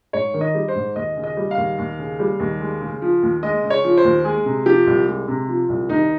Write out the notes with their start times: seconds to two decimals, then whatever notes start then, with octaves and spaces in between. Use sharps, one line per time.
0.13 G#2 C#5
0.34 D#3
0.41 D#5
0.55 G3
0.68 C5
0.75 G#2
0.96 D#2 D#5
1.16 C#3
1.23 D#5
1.37 G3
1.51 F5
1.57 D#2
1.78 D#2
1.99 C#3
2.19 G3
2.40 D#2
2.61 G#3
2.81 C#3
3.02 F3
3.22 D#2
3.43 G#3 D#5
3.63 C#3
3.70 C#5
3.84 F3
3.97 C5
4.04 D#2
4.24 G#3 G#4
4.45 C3
4.66 F3 G4
4.87 C2
5.07 G#3
5.28 C3
5.48 F3
5.69 C2
5.89 D#2 D#4